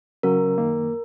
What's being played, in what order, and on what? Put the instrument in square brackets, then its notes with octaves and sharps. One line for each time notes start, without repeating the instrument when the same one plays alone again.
[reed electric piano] C#3 F#3 C#4 [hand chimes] A#4
[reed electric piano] F#2 D#3 A#3